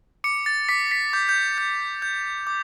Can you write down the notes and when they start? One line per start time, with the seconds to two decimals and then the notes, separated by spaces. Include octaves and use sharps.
0.24 D6 C#7
0.46 A6
0.69 D6 B6
0.91 B6
1.13 D6 G6
1.29 G6
1.58 G6
2.02 G6
2.47 D6